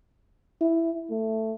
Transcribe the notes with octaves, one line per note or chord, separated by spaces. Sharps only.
E4
A3